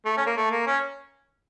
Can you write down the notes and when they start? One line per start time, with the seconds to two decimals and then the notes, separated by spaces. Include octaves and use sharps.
0.06 A3
0.17 C#4
0.26 A#3
0.37 A3
0.51 A#3
0.67 C#4